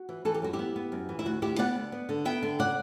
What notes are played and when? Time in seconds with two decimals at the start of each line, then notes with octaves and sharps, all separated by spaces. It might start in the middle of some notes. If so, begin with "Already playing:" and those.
Already playing: F#4
0.09 E3
0.25 E3 A4
0.34 G4
0.42 F#2 F#4
0.53 E4 G4
0.59 B3
0.76 B3
0.92 F#2
1.09 E3
1.19 E4
1.25 D2 F#4
1.42 D2 E4 G4
1.58 B3 D5 F#5
1.75 D2
1.92 B3
2.09 D3
2.25 B3 E5 G5
2.43 D3
2.59 C#3 D5 F#5